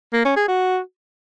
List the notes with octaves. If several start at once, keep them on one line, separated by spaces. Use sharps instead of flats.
A#3
C#4
G#4
F#4